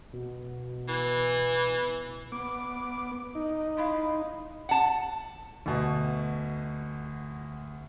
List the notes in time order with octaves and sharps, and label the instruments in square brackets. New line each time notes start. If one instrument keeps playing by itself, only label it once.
[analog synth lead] B2
[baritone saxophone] E3
[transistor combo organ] B3 D6
D#4
[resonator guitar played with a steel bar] G#3 E4 F5
F#5 A5
[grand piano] D2 B2